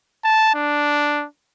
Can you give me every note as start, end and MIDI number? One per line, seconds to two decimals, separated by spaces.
0.24 0.53 81
0.54 1.25 62